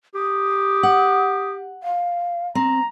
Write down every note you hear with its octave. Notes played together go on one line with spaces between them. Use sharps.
G4 D#6
F#5
F5
C4 A#5